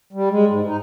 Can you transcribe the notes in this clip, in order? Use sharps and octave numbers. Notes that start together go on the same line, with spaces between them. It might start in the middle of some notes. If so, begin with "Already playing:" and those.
G3
G#3
G#2
D#4